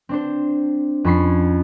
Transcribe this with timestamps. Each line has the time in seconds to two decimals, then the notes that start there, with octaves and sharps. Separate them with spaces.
0.09 C4 D4 C5
1.04 F2 C#4 B5 C#6 B6 C7